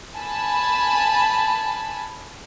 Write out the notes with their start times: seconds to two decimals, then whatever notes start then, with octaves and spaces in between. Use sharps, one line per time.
0.16 G#5 A5 B5